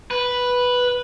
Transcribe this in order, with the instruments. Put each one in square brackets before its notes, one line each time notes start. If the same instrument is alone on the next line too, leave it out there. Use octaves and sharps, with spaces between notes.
[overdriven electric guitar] B4